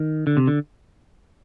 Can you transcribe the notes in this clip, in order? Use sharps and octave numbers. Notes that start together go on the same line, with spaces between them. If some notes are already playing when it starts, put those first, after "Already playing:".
Already playing: D#3
D3
C3
D3